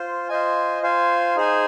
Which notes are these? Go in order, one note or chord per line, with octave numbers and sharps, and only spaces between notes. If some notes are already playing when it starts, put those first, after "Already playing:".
Already playing: F4 C5
F4 C5 D#5 G#5
F4 C5 F5 G#5
D#4 G#4 C5 G#5